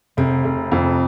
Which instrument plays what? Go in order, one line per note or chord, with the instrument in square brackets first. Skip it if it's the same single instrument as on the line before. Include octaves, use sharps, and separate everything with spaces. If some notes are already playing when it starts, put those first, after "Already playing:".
[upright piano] F1 [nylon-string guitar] C3
[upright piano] F1
F2